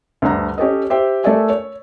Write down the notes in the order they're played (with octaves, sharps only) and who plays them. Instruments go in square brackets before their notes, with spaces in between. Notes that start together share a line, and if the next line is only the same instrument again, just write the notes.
[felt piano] D2 G2 D4 F#5 A#5
C#4 G4 A4 D#5
G4 C5 E5 G5
A3 A4 A#4 D5 E5 G#5
C#5